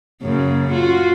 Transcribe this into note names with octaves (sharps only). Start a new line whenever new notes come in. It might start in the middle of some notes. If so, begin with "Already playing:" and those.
F#2 C#3 A#3
F4 F#4